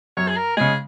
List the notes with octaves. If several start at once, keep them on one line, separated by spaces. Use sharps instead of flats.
F#2 C#5
G#4
A#4
C#3 G#3 G#4